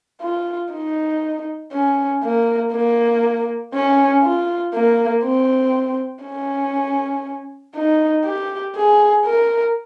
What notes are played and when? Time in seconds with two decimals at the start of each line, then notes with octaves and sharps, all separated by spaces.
0.22 F4
0.72 D#4
1.73 C#4
2.23 A#3
2.73 A#3
3.73 C#4
4.23 F4
4.74 A#3
5.24 C4
6.24 C#4
7.75 D#4
8.25 G4
8.76 G#4
9.25 A#4